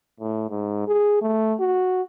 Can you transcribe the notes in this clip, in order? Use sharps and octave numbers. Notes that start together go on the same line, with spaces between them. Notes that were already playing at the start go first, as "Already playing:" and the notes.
A2
G#2
G#4
A3
F#4